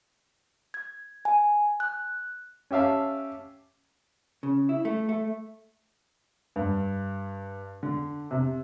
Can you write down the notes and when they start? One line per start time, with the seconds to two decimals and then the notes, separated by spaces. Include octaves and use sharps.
0.74 G#6
1.25 G#5
1.80 F#6
2.71 C#4 G4 E5 F5 A5
4.43 C#3
4.69 E4
4.85 A3
5.09 A3
6.56 G2
7.83 D3
8.31 C3